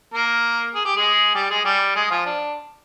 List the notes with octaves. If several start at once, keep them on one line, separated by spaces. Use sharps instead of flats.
A#3 A#4
G#4
G4
G#3 G#4
G3 G4
G#3 G#4
G3 G4
G#3 G#4
F3 F4
D4